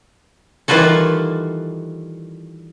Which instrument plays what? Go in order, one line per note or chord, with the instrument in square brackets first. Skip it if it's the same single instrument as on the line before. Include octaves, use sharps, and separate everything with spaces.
[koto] D#3 E3 G3 F4 F#4 A4